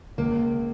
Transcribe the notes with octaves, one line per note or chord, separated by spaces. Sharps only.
C#2 A#3